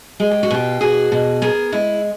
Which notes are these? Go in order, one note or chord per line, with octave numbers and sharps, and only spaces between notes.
G#3 G#4
G4
F#4
B2 F4 G4
B2 F#4 G#4
B2
B3 G#4 A#4
G#3 E4